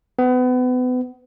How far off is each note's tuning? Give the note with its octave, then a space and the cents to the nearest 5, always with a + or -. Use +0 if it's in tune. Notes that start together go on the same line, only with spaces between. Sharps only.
B3 +30